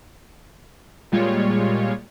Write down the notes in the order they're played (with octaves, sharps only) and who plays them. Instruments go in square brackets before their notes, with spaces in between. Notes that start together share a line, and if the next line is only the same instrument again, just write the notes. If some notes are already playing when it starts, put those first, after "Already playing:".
[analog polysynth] A#2 G3 G#3 F4 C#5